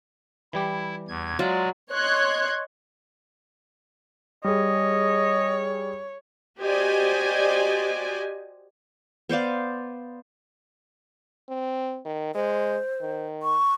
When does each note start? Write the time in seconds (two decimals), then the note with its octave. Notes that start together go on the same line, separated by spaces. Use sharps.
0.53 E3 G3 E4 G4
1.08 E2 G#6
1.39 F#3 G#3 F4 D5 F5
1.91 C#5 D#5 C6 F#6 G#6
4.44 G3 G#4 C#5 D#5
6.59 F#4 G4 C5 D5 D#5 G#5
9.29 B3 C5 D5 F5
11.49 C4
12.05 D#3
12.35 G#3 C5
13.01 D#3
13.43 C#6